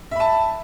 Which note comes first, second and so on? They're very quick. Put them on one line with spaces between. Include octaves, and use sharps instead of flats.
E5 B5 A5